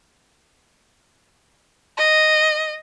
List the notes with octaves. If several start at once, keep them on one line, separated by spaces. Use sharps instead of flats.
D#5